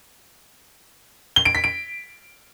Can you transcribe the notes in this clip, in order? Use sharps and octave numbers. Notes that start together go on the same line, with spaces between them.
G7
D7
B6
D7